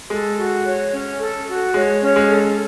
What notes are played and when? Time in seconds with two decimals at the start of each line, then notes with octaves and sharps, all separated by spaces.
0.10 G#3 A4
0.38 F#4
0.65 C#5
0.92 C#4
1.20 A4
1.47 F#4
1.74 G#3 C#5
2.02 C#4
2.16 G#3
2.29 A4